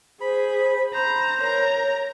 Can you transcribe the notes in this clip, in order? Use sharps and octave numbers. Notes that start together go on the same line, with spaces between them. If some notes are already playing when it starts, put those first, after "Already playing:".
G#4 C5 B5
C5 A#5 B5
A#4 C#5 A#5